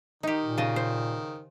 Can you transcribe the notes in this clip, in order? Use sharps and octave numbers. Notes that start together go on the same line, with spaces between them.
D#3 D#4 G4
A#2
C#3 D#5 A5
C5